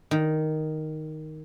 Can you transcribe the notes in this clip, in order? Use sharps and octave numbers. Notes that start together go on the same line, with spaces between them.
D#3